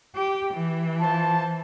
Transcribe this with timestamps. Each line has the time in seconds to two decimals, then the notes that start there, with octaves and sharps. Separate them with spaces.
0.14 G4
0.55 E3
1.01 F4 C5 A5